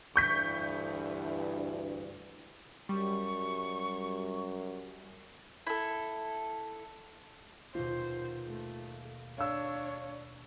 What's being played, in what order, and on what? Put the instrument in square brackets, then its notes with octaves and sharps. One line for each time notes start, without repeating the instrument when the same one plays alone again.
[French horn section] D2 G2 E3 [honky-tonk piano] C#6 G6 B6
[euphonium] F#2 [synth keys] G3 [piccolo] C#6
[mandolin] E4 A4
[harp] D#2 B2 [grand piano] F4 [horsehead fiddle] C5
[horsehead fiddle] A3
[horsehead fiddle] D4 C#5 [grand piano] F5 E6